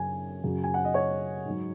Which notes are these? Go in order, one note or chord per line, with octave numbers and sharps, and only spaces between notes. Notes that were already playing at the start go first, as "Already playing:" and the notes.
Already playing: F#2 C#3 F#3 G#5
F#2 C#3 F#3
G#5
F#5
D#5
C#5
G#2 F#3